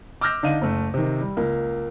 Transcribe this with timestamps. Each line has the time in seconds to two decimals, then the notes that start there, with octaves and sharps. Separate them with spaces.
0.21 D6 E6 F6 G6 A#6
0.43 D3 D4 D#4 F5 D#7
0.61 F#1 A3
0.94 C3 D#3
1.21 G3
1.37 C#2 A#3